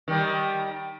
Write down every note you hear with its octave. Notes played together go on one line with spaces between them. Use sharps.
D#3 G3